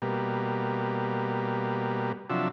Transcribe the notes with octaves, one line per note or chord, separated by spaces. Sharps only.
B2 G3 A#3
C3 F3 F#3 D4 E5